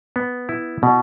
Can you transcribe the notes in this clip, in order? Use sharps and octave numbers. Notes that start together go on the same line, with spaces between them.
B3
E4
B2